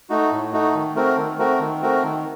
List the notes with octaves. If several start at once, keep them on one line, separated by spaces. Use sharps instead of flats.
A3 D#4 F#4
A2
A3 D#4 F#4
D#3
A3 C4 F#4 A#4
D#3
A3 C4 F#4 A#4
D#3
A3 C4 F#4 A#4
D#3